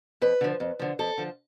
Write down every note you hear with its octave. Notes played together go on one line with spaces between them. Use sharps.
F2 B4
D3 F3
F2
D3 F3
F2 A4
D3 F3